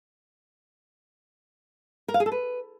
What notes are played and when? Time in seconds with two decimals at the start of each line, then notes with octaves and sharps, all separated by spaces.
2.08 A#4
2.14 F5
2.20 G#4
2.26 A4
2.32 B4